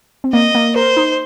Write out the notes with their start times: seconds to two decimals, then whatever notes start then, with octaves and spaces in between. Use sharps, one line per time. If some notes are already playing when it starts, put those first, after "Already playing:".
0.24 C4
0.33 A#3 D#5
0.55 A#3
0.76 A#4 C5
0.97 D#4